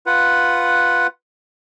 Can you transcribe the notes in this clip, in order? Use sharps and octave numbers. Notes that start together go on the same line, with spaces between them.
F4 B4 F#5